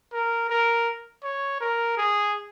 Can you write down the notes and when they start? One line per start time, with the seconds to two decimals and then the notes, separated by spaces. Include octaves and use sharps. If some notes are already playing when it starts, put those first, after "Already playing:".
0.13 A#4
0.49 A#4
1.23 C#5
1.61 A#4
1.97 G#4